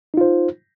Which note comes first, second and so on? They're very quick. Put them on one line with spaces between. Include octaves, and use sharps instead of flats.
D#4 F4 C5